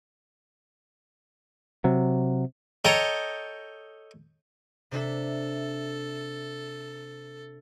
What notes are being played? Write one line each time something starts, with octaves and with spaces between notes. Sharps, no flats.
C3 F#3
A4 C#5 D#5 G5 A#5
C3 D4 A4 E5